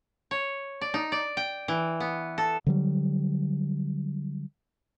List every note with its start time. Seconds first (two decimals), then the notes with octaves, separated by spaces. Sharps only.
0.31 C#5
0.81 D5
0.94 D#4
1.12 D5
1.37 G5
1.68 E3
2.00 B3
2.38 A4
2.67 D3 F#3 G3